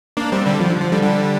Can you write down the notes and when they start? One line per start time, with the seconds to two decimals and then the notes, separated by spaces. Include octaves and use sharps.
0.17 A#3 D4
0.32 G3 C4
0.45 D3 G3
0.60 F3
0.70 D3
0.81 F3
0.92 D3 G3
1.03 D3 G3